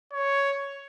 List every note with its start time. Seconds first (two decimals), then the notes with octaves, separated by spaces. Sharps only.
0.13 C#5